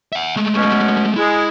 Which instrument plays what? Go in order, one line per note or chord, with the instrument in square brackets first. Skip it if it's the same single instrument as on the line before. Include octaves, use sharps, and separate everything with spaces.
[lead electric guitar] E5 F#5
G#3 A3
[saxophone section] B2 C#4
[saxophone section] G#3 [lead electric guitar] E4